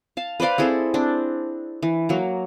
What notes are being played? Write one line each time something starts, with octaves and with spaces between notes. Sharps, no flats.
F5 A5
B4 C5 D5 F5
C4 E4 G#4 A4
C4 D4
E3
F#3 A#3